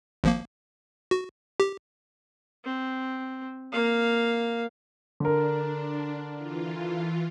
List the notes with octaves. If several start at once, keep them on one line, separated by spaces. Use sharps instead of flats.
G#1 F3 A#3
F#4
G4
C4
A#3 F5
D3 D4 A#4
E3 F4